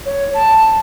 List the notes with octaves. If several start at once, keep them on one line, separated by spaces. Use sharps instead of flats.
C#5
A5